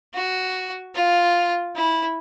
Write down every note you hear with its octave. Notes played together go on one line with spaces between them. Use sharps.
F#4
F4
E4